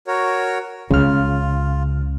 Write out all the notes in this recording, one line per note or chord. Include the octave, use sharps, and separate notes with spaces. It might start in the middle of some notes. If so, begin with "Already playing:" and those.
F#4 A#4 C#5
C#2 C#3 F4 F6